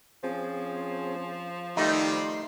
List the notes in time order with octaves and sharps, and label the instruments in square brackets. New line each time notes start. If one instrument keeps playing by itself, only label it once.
[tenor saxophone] F3 [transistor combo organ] C4 C#4 G#4
[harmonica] D#3 G3 G4 [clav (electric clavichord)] A3 D#4 [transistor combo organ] C6